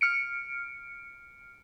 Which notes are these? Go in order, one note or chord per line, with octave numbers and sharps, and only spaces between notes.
F6 C#7 D7